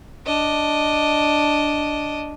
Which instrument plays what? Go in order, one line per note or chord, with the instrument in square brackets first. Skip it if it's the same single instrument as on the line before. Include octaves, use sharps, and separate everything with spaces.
[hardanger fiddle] D4 D#5